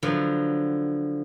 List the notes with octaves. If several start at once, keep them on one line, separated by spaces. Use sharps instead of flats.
D3 F3 F#3 B3